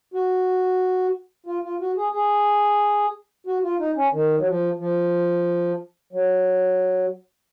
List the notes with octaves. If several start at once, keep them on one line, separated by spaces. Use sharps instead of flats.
F#4
F4
F4
F#4
G#4
G#4
F#4
F4
D#4
C#4
D#3
F#3
F3
F3
F#3